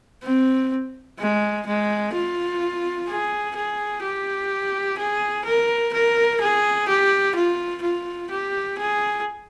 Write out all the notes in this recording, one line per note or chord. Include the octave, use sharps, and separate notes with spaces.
C4
G#3
G#3
F4
G#4
G#4
G4
G#4
A#4
A#4
G#4
G4
F4
F4
G4
G#4